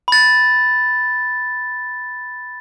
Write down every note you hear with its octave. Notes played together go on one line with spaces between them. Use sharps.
B5 A6